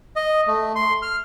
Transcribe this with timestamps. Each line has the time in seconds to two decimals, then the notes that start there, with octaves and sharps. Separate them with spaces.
0.16 D#5
0.47 A3
0.76 C6
1.02 F6